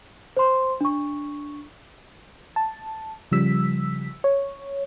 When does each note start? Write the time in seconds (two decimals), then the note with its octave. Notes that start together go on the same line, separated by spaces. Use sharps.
0.37 C5 C6
0.81 D4 C#6
2.56 A5
3.31 C#3 F3 G3 E6 B6
4.24 C#5